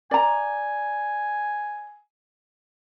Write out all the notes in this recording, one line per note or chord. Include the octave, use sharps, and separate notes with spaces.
D5 G#5 A#5